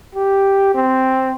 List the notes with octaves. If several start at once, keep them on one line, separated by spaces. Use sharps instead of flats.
G4
C4